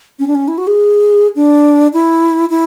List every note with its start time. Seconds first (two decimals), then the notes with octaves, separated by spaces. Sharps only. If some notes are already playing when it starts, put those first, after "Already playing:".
0.19 C#4
0.28 D4
0.35 C#4
0.48 E4
0.58 F#4
0.67 G#4
1.36 D4
1.93 E4
2.50 E4